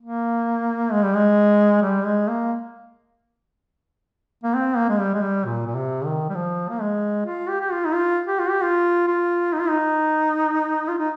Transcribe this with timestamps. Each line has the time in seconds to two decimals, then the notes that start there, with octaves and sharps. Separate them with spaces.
0.01 A#3
0.92 G#3
1.03 G3
1.15 G#3
1.82 G3
2.05 G#3
2.28 A#3
4.44 A#3
4.55 C4
4.77 A#3
4.89 G#3
5.00 G3
5.14 G#3
5.23 G3
5.45 A#2
5.67 A#2
5.75 C3
6.05 D#3
6.30 G3
6.35 F3
6.70 A#3
6.81 G#3
7.26 F4
7.49 G4
7.60 G4
7.72 F4
7.86 D#4
7.94 F4
8.27 G4
8.39 F4
8.50 G4
8.62 F4
9.07 F4
9.53 D#4
9.60 F4
9.69 D#4
10.89 F4
10.99 D#4